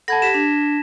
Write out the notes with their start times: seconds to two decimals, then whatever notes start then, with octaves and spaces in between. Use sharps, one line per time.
0.08 A4 F#5 A5 B5 G#6 A#6
0.22 G4 B6 E7
0.34 D4